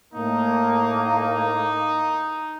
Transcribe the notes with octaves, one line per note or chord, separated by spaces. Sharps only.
A2 A#3 D#4